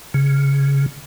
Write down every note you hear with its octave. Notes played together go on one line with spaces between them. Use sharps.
C#3